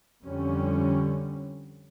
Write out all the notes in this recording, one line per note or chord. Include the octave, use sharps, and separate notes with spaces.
F2 D3 G3 C#4